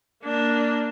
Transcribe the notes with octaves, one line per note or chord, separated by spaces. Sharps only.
A#3 D4